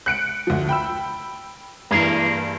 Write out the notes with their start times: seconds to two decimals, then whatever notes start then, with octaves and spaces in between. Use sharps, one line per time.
0.06 F#6 C#7 D7
0.47 D2 F3
0.69 G5 B5 E6
1.91 G2 E3 A#3 G#4 A#4